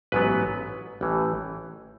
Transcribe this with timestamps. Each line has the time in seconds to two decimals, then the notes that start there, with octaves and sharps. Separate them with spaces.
0.12 A1 G#2 F#3 B3 B4
1.01 A1 A2 E3